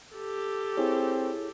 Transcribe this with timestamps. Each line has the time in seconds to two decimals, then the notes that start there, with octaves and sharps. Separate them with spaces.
0.14 G4 A4
0.77 C4 E4 G#4 C#5